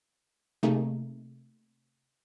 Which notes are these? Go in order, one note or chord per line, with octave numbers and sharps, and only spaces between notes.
C3 A3 A#3 D#4 G#4